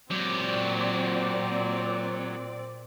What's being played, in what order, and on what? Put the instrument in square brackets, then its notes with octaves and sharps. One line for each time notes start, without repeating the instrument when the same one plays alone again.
[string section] A#2 C4 D5 [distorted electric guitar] F#3 G4